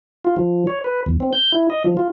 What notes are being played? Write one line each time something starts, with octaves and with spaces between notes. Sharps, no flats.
F4
F3
C#5
B4
E2
C4
G6
E4
D#5
F3
F4